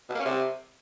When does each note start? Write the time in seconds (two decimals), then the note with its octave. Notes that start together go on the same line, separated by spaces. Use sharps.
0.09 B2
0.14 A#3
0.20 C#4
0.25 C3